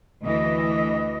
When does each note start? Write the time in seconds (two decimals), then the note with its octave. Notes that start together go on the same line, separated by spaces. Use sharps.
0.22 D2 E3 D#5